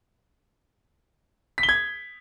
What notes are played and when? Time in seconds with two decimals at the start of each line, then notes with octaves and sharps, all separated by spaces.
1.58 B6
1.63 G7
1.69 G#6